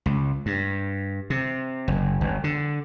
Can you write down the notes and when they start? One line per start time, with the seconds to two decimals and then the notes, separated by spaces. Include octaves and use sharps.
0.06 C#2
0.46 G2
1.30 C3
1.88 F#1
2.21 G1
2.44 D3